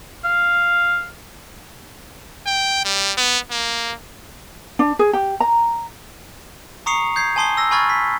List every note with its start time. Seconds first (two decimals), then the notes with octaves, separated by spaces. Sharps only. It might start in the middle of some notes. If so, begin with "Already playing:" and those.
0.24 F5
2.46 G5
2.85 G3
3.18 B3
3.51 A#3
4.79 D4
4.99 G#4
5.13 G4
5.40 A#5
6.86 A#5 C#6 D#6 C7 C#7 F7
7.16 D#6 G6 G#6 C7
7.36 G#5 A5 C6 D#6 C7 G7
7.57 E6 A#6
7.71 G#5 B5 C#6 F6 G#6 A6
7.90 B6